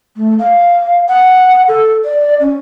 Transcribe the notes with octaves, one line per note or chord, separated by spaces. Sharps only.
A3
F5
F#5
A4
D5
C#4